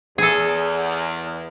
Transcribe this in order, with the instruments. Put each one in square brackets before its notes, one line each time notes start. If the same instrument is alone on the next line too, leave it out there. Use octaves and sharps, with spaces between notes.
[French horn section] E2 [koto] G#4 A4